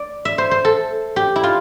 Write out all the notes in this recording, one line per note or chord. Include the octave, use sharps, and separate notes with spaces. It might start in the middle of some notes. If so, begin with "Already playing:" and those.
Already playing: D5
E5
C5
C5
A4
G4
E4
F4